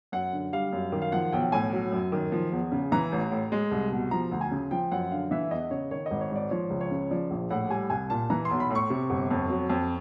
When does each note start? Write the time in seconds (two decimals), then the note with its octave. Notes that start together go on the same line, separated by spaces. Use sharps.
0.12 F#2 F#5
0.33 D3
0.53 G3 F5
0.72 F#2
0.92 D#3
1.02 F5
1.12 F3 F#5
1.33 B1 G5
1.52 A2 G#5
1.73 F#3
1.92 F#2
2.12 D#3
2.32 F3
2.52 E2
2.72 C#3
2.92 E3 A#5
3.12 A1
3.31 A2
3.52 G#3
3.71 C2
3.92 B2
4.11 F3 A#5
4.32 D2
4.41 G#5
4.51 C#3
4.71 F3 G5
4.91 F#2 F#5
5.11 D3 F5
5.31 E3 E5
5.51 E2 D#5
5.71 C#3 C#5
5.91 D#3 C#5
6.06 D#5
6.11 G#1
6.21 C#5
6.31 G#2 D5
6.51 F3 C#5
6.70 C#2
6.81 C#5
6.91 C#3
7.11 F3 D5
7.30 A#1
7.50 A2 F#5
7.70 G3 G#5
7.90 C2 G#5
8.10 A#2 A5
8.30 E3 A#5
8.45 C6
8.50 B1
8.60 B5
8.70 A2 C#6
8.90 C3
9.10 G1
9.31 F2
9.50 F#3
9.69 F2